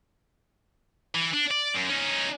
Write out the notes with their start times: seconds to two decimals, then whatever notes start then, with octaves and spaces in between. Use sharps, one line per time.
1.14 E3
1.33 D4
1.51 D5
1.75 F#2
1.90 C#4 D#4